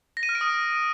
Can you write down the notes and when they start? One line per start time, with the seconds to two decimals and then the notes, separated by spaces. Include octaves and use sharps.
0.17 A#6
0.23 D#7
0.29 F6
0.35 D7
0.41 D#6